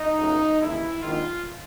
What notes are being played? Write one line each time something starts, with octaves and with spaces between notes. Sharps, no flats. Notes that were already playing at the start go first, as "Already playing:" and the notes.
Already playing: D#4
C#2 B2 F#3 A3
D#2 C#3 E3 G#3 E4
A#1 G#2 D#3 F4